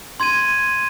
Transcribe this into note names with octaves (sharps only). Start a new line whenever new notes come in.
C6 G#6 D#7